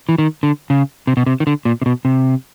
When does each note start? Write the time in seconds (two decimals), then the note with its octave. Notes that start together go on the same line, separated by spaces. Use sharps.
0.09 E3
0.18 D#3
0.43 D3
0.70 C#3
1.07 C3
1.17 B2
1.26 C3
1.40 D#3
1.47 D3
1.65 A#2
1.82 C3
1.86 B2
2.05 C3